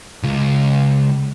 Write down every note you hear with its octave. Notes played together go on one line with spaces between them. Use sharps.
C#2